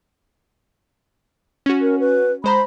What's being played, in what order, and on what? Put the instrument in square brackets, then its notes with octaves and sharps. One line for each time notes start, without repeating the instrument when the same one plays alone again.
[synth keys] C#4 F#4
[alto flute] A#4
B4
[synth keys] G#3 C5 A#5 [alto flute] B5